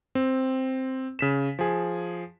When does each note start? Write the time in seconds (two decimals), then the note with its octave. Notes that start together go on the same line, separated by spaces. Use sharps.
0.15 C4
1.19 C#3 B6 E7
1.59 F3 G#4